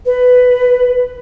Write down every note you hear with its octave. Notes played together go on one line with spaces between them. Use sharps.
B4